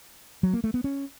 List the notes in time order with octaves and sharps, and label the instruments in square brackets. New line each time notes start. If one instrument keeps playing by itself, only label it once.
[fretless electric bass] F#3
A#3
A3
B3
C#4